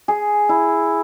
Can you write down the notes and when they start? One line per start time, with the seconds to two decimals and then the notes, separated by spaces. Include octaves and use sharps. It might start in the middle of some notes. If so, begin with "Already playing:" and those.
0.08 G#4
0.49 E4